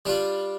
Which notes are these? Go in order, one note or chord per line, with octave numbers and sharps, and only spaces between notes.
G3 D4 F4